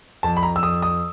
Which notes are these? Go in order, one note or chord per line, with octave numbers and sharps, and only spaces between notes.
F2 A5
B5
A#5
E6
F2 D#6
D#6